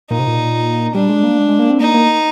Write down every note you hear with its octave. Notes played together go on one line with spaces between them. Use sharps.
A#2 D#4
C3
A#2
G3 D4
G#3
A#3
G#3
G#3
A#3
C4
A#3 D#4
A#3